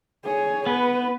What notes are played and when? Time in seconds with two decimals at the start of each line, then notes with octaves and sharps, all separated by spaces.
0.24 G#4 C#5
0.66 B3 B4